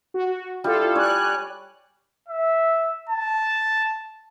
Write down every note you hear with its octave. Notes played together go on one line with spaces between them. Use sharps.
F#4
G3 E4 F4 A4
C#5 D5 G#5 F#6
E5
A5